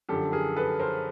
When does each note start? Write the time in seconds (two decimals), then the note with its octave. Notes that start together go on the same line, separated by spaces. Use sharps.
0.09 F#2 D3 F3 G4 A4
0.32 G#4 A#4
0.56 A4 B4
0.79 A#4 C5